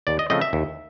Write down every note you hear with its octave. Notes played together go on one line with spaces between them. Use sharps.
D#2 D5
D#5
C#3 F3 A3 C4 D#5
E5
D#2